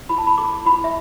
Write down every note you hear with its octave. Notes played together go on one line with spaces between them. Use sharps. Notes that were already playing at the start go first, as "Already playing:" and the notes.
E4 B5
A5
B5
A4 D6
E4 B5
E5